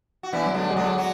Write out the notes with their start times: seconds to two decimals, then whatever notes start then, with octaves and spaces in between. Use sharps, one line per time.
0.23 F#4
0.33 E3 B3 D4 E4
0.46 F#3
0.54 D3 G#3 D4
0.70 G#3
0.76 D3 F#3 D4
0.98 F#3 F#4